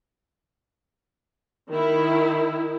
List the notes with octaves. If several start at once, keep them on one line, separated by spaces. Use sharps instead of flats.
D#3 E4